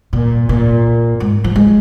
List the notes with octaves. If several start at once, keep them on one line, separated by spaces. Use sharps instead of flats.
A#2
A#2
G#2
F3
G#3